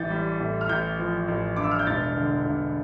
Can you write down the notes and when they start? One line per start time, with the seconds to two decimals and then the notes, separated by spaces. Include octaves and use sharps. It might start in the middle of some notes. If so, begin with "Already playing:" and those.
Already playing: A1 E3 G6 A6
0.10 G3
0.40 A2
0.61 F6
0.69 A1 G6
0.99 F3
1.28 A1
1.56 G2 D6
1.64 E6
1.71 F6
1.79 G6
1.87 E1 A6
2.17 D3
2.46 E1